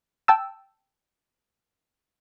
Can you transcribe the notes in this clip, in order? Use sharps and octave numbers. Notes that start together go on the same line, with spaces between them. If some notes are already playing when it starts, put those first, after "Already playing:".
G5 A5 E6